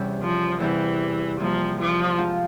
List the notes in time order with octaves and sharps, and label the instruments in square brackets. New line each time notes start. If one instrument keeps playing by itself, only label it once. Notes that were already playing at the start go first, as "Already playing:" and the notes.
Already playing: [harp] E2 C3 G3 C#4
[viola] F3
[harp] E2 C3 G3 C4 [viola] E3
[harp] C3 G3 A#3 [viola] F3
[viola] F3
[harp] G#2 F3 C4 F4